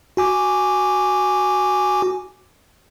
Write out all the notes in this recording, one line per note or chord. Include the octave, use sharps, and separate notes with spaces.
F#4 G#5 D6